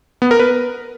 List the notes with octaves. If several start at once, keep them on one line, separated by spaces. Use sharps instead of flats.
B3
A#4
B4